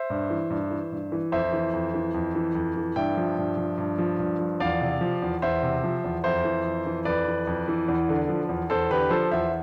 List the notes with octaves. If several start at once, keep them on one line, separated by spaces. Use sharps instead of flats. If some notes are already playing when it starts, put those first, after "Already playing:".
Already playing: C5 E5
G2
E3
G2
E3
G2
E3
F2 C5 E5
E3
F2
E3
F2
E3
F2
E3
G2 E5 G5
F3
G2
F3
G2
F3
G2
F3
E2 D5 F5
C3
F3
E2
E2 C5 E5
C3
F3
E2
F2 C5 E5
E3
F2
E3
F2 B4 D5
E3
F2
E3
E2
D3
F3
E2
E2 A4 C5
D3 G4 B4
F3 A4 C5
E2 C5 E5